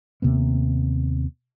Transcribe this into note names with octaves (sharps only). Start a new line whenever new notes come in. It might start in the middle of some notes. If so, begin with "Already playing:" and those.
D#2 C3 A#3 B3